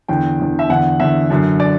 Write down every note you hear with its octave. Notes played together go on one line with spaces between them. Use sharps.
E2 D3 G5
E2 D3
E5
E2 D3 F#5
E2 D3 E5
F#2 D3
D5